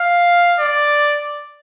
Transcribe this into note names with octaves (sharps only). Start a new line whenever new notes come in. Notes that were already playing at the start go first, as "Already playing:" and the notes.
Already playing: F5
D5